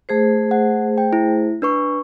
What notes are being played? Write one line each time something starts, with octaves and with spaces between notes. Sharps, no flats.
A3 G#4 C5
F#5
G5
E4
D4 B4 C#6